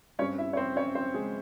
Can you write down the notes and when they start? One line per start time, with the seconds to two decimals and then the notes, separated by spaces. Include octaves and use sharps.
0.19 G2 G3 C4 C#4 C#5
0.38 E4 E5
0.53 C#5
0.57 C4 C5
0.76 C#4 C#5
0.95 C4 C5
1.14 G#3 G#4